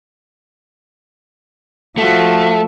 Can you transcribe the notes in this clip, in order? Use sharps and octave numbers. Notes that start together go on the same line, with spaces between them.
F3 A3 F#4